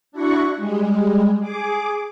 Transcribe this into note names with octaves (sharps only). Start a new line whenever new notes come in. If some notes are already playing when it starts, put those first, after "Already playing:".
D4 E4 F#4 F#5 C#6
G3 G#3
G#4 D6